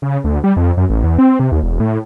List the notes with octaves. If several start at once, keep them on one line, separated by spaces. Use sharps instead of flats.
C#3
D2
G3
F2
F#2
A1
E2
C4
C3
D#2
E1
A2